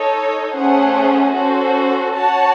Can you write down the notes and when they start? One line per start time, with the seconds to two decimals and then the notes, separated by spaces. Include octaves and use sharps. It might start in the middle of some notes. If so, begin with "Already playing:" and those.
Already playing: D#4 A4 C#5
0.54 A3 C#4 G#4 C5 F#5
1.34 C#4 F#4 A4 C5
2.14 F#4 C#5 F#5 A5